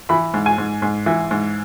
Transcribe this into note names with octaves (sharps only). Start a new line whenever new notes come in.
E3 B5
G#2
G#5
G#2
G#2
E3
G#2